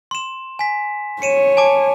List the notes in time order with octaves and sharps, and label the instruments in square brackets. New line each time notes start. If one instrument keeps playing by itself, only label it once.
[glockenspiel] C6 E7
G#5 B6
[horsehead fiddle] C#5 [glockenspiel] C#7 D#7 E7
[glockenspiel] G#5 A5 D6